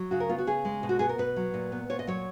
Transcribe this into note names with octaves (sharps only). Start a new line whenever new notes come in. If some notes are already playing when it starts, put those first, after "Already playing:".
Already playing: F#3
C#3 F#4
A#4
B3 F4
F#4
C#3 G#4
G#3
B2
F#4
B3 G#4
A#4
B2 B4
F#3
A#2
B3
A#2 C#5
D#5
F#3 C#5